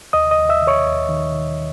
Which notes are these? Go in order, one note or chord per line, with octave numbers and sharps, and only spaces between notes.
D#2 D#5 D#6
D#5 D#6
D#2
E5 E6
D#3
C#5 C#6
D#2
D#3
D#3